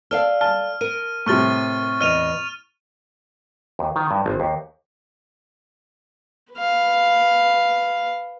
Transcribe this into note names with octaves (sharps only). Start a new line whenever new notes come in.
A4 D5 F5 F6
A5 F6
A#4 D#7
A2 C3 C#6 F6 A6
E2 D#5 F6 D#7 F7
D#2
D#3
G2
G#1
D#2
B4 F5